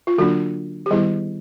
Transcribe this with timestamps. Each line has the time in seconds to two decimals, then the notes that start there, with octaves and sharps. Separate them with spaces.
0.07 F4
0.18 D3 F#3 A#3 D4 F#4
0.86 G4
0.91 D#3 G3 B3 E4 G#4